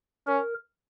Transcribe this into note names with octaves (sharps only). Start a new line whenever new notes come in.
C#4 A#4